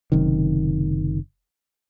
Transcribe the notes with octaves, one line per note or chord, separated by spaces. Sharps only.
F#1 F#2 C3 D#3